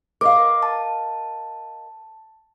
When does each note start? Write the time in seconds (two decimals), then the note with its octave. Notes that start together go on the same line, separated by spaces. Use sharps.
0.21 A#4 D#5 F5 D6
0.63 A5